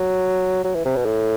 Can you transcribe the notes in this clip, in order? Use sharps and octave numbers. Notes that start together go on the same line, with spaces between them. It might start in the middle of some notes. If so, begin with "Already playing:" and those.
Already playing: F#3
F#3
E3
C3
B2
A2